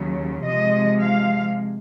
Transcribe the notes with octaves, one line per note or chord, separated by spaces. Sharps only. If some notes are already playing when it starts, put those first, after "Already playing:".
Already playing: D#2 C#3 F#3
C3 F3 G#3 D#5
F5